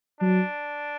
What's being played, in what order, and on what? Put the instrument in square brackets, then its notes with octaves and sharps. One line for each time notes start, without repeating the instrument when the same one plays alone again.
[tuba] F#3 [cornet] D4